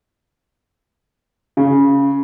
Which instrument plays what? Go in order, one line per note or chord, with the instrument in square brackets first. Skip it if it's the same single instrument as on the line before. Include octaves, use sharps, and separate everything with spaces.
[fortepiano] C#3